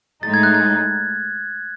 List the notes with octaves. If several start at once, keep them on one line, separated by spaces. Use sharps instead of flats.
A2 G#3 D#4 A6
G#6
F#6
G#6